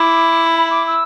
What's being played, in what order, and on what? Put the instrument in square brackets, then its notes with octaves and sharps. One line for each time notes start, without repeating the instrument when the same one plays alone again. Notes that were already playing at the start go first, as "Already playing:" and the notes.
Already playing: [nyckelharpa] E4 [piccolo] D6
[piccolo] B5
D6
E6